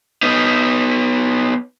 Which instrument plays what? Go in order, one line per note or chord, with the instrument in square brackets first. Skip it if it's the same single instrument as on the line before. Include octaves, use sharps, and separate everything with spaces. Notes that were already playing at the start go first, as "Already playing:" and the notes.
[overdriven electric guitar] B3 D#4